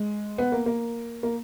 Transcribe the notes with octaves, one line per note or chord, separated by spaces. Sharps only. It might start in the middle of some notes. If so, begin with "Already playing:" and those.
Already playing: G#3
B3
A#3
A#3
A#3